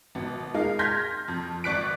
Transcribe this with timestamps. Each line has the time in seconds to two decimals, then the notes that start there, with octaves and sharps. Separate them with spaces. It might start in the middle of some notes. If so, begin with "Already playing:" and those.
0.15 G#1 B2
0.54 G#3 D#4 A#4 F5
0.79 C6 F6 G6 G#6 A#6 B6
1.28 F2
1.64 G#1 D5 C#6 F#6 B6 D7